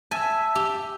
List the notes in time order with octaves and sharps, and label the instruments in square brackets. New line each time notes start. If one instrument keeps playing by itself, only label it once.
[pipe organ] E5 [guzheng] G#5 [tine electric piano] A5 E6
[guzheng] G4